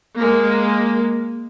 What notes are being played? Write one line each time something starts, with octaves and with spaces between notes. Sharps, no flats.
G#3 A#3